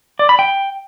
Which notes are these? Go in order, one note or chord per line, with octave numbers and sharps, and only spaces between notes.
D5
B5
G5